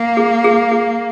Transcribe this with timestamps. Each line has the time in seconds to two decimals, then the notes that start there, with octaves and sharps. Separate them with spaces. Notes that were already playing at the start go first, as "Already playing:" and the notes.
Already playing: A#3
0.17 G#4
0.44 G#4
0.72 G#4